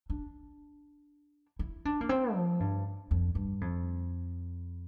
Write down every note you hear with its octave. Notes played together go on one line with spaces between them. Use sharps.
D4
E4
D4
A#3
C4
F3
G2
F2
G2
F2